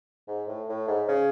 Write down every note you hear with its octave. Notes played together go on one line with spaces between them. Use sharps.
G#2
A2
A2
G#2
C#3